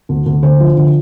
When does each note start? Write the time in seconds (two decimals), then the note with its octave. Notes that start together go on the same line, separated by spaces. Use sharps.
0.09 D2
0.26 D2
0.43 D3 C5
0.60 F3
0.77 D3